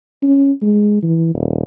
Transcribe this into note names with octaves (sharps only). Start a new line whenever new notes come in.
C#4
G#3
E3
D#1